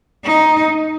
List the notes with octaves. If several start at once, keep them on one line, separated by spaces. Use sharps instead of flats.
D#4